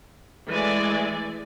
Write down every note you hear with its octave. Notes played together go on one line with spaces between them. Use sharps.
E3 G#3 A3 D5 G#5